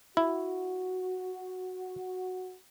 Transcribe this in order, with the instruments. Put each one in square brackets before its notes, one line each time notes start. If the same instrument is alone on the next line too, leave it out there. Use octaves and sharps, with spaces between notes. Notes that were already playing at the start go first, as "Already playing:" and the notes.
[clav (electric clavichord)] E4 [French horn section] F#4